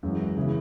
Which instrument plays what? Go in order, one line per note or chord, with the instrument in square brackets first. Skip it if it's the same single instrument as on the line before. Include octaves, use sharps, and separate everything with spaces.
[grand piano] F#2 E3 G#3
C#3 E3 B3 E4